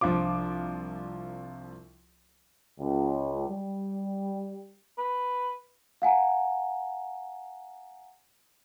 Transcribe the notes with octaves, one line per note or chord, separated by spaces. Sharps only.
C2 F3 D4 F4 D6
C#2
G3
B4
F5 F#5 G#5 A#5